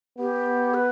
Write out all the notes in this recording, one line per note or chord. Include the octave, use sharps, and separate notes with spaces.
B3 G4
B4